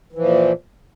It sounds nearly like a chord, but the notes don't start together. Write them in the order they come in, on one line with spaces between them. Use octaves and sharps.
E3 F3 A#2